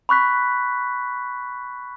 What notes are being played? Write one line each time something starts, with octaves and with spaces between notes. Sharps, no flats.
B5 C#6 F#6 B6